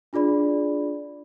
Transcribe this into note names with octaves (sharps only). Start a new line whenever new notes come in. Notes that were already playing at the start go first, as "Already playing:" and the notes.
D4 F4 G#4 D5 B5